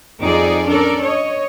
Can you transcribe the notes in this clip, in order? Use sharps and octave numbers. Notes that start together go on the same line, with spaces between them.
F2 C4 D#4 F4 G#4 D5
C#4 D4 A4 A#4 D5
C#5 D#5